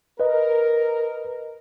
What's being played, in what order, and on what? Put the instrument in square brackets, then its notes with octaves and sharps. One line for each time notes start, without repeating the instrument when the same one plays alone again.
[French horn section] A#4 [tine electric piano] B4 D#5